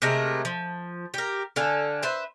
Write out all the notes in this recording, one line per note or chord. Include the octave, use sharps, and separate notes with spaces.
C3 G#3 A3 A#4
F3
G4 A#4
D3 A4 F5 G#5
B4 C5 E5